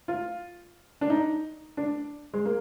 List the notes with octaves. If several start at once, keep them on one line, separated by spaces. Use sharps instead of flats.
F4
D4
D#4
D4
G#3
A#3